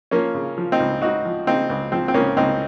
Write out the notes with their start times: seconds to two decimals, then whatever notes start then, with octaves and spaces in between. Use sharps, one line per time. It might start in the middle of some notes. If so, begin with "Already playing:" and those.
0.11 F3 A#3 C#4
0.34 C#3
0.58 F3
0.72 C4 D#4
0.80 C#2
1.01 C#2 D#4 F#4
1.25 F3
1.47 C#3 C4 D#4
1.69 C#2
1.92 F3 C4
2.08 C4
2.14 C#2 A#3 C#4
2.37 C#2 C4 D#4